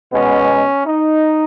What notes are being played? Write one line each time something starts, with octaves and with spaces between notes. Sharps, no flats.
B2 G#3 B3 C#4
D#4